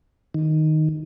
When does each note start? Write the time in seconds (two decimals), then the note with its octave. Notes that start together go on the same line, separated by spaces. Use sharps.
0.34 D#3